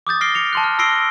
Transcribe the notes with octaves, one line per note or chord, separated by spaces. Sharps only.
D6 D#6 G6 A6
F6 A#6 C7 D7 G7
C#7 F7
A5 C6 F#6
F6
B5 E6 A#6 C7 D7 G7